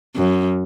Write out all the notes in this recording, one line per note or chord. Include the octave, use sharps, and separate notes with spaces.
F#2